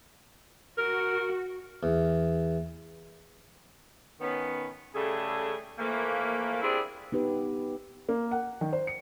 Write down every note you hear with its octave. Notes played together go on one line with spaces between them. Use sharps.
F#4 A#4
E2
D#3 B3 C#4
C#3 G3 A3 G#4 A4
E3 F3 A3 A#3
B3 C4 D4 E4 G4 G#4
B3 D#4 G4 B4
A#3
F#5
D#3
C5
C#7